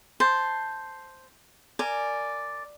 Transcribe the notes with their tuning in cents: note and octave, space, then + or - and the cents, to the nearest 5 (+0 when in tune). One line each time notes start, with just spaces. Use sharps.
C5 +0 A5 +0
A#4 -20 D5 +0 G#5 +0